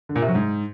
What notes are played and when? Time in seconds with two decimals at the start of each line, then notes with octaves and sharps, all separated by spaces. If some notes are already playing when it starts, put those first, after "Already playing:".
0.09 D3
0.16 A#2
0.22 C3
0.28 F#3
0.35 G#2